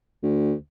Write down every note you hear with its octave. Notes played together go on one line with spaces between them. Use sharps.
D2